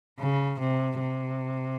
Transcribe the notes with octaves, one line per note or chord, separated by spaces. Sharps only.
C#3
C3
C3